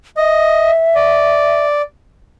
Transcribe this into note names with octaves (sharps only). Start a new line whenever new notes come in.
D#5 E5
D5